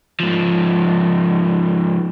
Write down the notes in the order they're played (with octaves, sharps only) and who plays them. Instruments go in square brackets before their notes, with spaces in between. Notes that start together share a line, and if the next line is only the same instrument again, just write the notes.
[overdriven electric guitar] G#2 F3